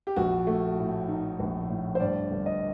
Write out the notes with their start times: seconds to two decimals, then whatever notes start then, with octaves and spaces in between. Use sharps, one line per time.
0.07 G4
0.16 A#1 F#4
0.47 A3
0.79 A2
1.08 D#4
1.39 A#1
1.69 A2
1.95 C5
2.00 G2 D5
2.31 G1
2.46 D#5